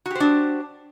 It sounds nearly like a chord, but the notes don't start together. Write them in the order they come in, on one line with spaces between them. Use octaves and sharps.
F#4 G4 C5 D4